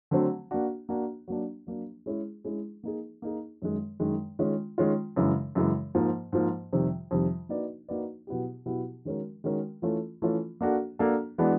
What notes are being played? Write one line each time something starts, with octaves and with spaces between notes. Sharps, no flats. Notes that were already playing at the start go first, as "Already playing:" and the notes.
D3 F#3 A3 C4
A#3 D4 F#4
A#3 D4 F#4
F#3 A#3 D4
F#3 A#3 D4
G#3 C#4 E4 G#4
G#3 C#4 E4 G#4
A#3 D#4 G#4
A#3 D#4 G#4
F#2 D#3 G#3
F#2 D#3 G#3
D#3 G#3 C#4 F4
D#3 G#3 C#4 F4
F#2 C#3 E3 G#3
F#2 C#3 E3 G#3
G#2 F3 A#3
G#2 F3 A#3
F2 C3 D#3 G3
F2 C3 D#3 G3
A#3 D#4 F#4 B4 D5
A#3 D#4 F#4 B4 D5
B2 F#3 B3 E4 G4
B2 F#3 B3 E4 G4
D#3 G#3 C#4 F#4 A#4
D#3 G#3 C#4 F#4 A#4
E3 A3 C#4 F4 A4
E3 A3 C#4 F4 A4
A#3 D4 F#4 A4
A#3 D4 F#4 A4
E3 G#3 B3 D4 F#4